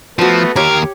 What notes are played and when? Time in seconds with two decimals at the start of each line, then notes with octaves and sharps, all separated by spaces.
0.19 F3 A3 B3 F#4 A5
0.56 D#2 G4 A#4 C#5 D6 F6 G#6